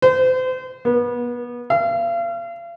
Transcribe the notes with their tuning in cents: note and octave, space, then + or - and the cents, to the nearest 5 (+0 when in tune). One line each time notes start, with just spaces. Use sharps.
C5 -35
B3 -30
F5 -40